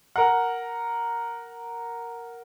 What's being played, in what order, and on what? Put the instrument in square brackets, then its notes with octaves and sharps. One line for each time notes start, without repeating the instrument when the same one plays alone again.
[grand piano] A#4 F#5